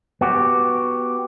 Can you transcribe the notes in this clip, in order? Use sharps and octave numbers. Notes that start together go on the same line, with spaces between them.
B3 F#4 G4